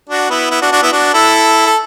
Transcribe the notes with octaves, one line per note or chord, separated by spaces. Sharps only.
D4 F#4
B3 E4
B3 E4
D4 F#4
D4 F#4
B3 E4
D4 F#4
E4 A4
A4